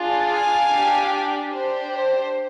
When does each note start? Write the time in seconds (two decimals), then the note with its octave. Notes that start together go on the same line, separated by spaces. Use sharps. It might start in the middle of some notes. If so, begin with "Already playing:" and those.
Already playing: D4 F4 G#4
0.30 F5 G#5
0.71 D4 G4
1.52 D4 G4 C5
1.94 C5